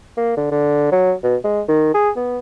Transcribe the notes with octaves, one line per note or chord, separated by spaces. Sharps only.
A#3
D3
D3
F#3
B2
G#3
D#3
G#4
B3